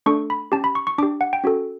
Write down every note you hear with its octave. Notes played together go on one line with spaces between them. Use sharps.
A3 D4 A4 C#6
B5
C#4 G4 A5
B5
C#6
C#6
D4 G4 D6
F#5
G5
C#4 F#4 A4